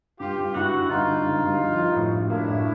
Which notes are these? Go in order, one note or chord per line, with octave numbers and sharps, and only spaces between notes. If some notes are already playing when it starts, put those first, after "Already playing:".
G2 F4 G4
G2
G2 E4 F#4
D3
G2 D#4 F4
D3
G2
G2
F3
F3
A2
A2
A#3 D4 E4
A2